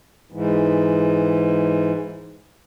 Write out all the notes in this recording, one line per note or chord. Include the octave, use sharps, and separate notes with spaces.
G#2 E3